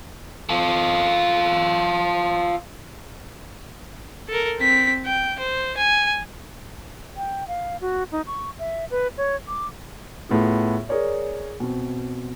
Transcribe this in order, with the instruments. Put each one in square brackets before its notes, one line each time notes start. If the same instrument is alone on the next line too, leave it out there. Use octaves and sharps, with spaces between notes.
[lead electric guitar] F4 A4
[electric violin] A4 A#4
C4 B6
G5
C5
G#5
[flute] G5
F5
F#4
D#4
C#6
E5
B4
C#5
D6
[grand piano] A2 B3 F4 G#4
G#4 A#4 C#5 D5
B2 C4